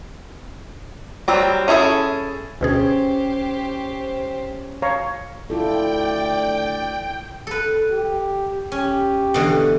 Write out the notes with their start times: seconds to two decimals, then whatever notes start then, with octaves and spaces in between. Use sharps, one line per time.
1.28 F#3 G3 C4
1.68 C#4 E4 G#4 A4
2.61 D2 B2 C#4 G4 G#4 C5
4.82 C#5 F5 A#5
5.50 D2 A3 E4 F4 A4 D5 G5
7.47 A4 B4
7.91 G4
8.72 C#4 G4
9.34 B2 D3 E3